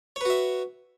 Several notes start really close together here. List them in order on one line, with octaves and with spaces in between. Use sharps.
C#5 B4 F#4 E5